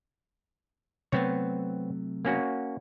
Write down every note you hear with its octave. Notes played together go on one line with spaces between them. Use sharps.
C3 F#3 A3 B3 C4 C#5
A#3 C#4 F#4